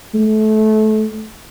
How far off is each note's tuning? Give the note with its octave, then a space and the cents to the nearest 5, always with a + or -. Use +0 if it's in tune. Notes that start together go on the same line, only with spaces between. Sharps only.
A3 -25